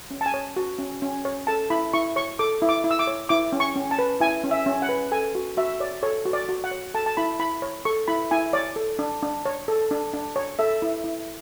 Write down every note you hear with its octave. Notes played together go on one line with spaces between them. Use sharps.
C#4
A5
G#5
C#5
F#4
C#4
C#4
C#5
A4 A5
E4 B5
E4 C#6
C#5 C#6
A4 D6
E4
D6
E4
E6
D6
C#5
E4 D6
C#4
C#6
C#4
A5
B4
E4 G#5
C#4
E5
C#4
F#5
B4
A4 G#5
F#4
F#4 E5
C#5 D5
A4 C#5
F#4
D5
F#4
F#5
C#5
A4 A5
A5
E4 B5
E4 B5
C#5
A4 C#6
E4 B5
E4 G#5
C#5 D5
A4
D4
D4
C#5
A4
D4
D4
C#5
A4 E5
E4
E4